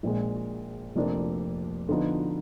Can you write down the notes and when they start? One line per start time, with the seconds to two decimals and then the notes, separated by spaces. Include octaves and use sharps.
0.03 A#1 A#2 G#3
0.95 F1 F2 F3 A#3 D4
1.89 D3 F3 B3 D#4